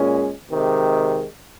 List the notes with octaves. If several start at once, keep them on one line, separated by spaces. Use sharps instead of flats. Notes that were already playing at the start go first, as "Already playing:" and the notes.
Already playing: A#2 G#3 C#4
C3 D#3 G#3